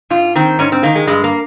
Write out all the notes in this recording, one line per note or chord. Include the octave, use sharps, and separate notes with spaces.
G#2 F4
D#3 C4
G#2 C#4
C4
D#3 A#3
G#3
G2 G#3
A#3